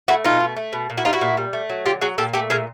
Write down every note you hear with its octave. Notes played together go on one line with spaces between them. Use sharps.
A3 E4 F#4
B2 D#4 F4
A3
A3
B2
A#2
E4 F#4
G3 D#4 F4
E4 F#4
A#2
G3
A3
F#3
D3 F4 G4
F#3 F#4 G#4
A#2 G4 A4
A3 G4 A4
A#2 G#4 A#4